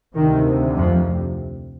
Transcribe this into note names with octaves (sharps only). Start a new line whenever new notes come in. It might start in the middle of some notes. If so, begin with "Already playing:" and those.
D2 C3 D#3
F2 F3